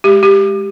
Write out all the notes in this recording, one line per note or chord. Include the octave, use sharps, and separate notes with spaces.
G#3 G4
G4